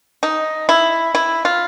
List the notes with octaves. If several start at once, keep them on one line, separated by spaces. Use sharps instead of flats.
D#4
E4
E4
F4